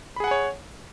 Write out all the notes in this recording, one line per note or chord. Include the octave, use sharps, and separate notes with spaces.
G#4 C#5 F#5 G#5 B5